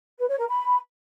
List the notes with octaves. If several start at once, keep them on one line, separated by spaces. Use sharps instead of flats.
B4
C#5
A#4
B5